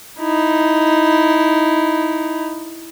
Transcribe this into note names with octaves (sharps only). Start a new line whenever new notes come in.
D#4 E4